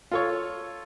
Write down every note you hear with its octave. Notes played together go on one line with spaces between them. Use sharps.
F4 A4 C#5